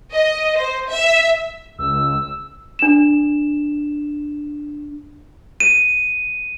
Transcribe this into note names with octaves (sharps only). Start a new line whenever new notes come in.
D#5
C5
E5
C#2 E6
D4 E7
D#7